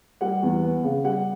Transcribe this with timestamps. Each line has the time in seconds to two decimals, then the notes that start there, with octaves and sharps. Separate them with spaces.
0.21 G3 F#5
0.43 E2
0.63 B3
0.84 C#3
1.04 G3 F#5